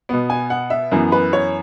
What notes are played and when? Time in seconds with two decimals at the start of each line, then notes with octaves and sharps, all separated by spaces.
0.09 B2 B3
0.30 G#5
0.50 F#5
0.70 E5
0.92 F#2 E3 B3
1.12 B4
1.33 C#5